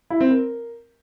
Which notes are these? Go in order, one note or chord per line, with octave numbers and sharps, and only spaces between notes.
E4
C4
A#4